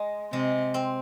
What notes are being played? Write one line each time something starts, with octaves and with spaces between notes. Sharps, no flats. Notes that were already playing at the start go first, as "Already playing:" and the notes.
Already playing: G#3
C3 G#3
C4